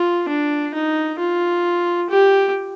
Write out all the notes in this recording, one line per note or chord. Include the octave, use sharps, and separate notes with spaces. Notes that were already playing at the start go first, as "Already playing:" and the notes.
Already playing: F4
D4
D#4
F4
G4